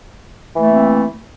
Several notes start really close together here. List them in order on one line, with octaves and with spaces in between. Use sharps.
E3 A3 A#3 C4